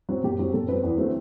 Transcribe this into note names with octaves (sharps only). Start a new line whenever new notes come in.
F#3 C4
F#2 G4
F#3 C4
F#2 A4
F#3 C4 B4
E2
D3 F#3 A3 C4